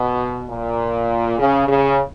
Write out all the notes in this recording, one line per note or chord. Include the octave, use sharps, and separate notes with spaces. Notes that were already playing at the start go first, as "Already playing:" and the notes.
Already playing: B2
A#2
C#3
C#3